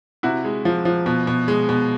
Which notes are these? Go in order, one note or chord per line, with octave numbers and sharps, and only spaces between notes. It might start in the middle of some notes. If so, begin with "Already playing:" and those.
C3 E4 F#4
G#3
F3
F3
B2
B2
G#3
B2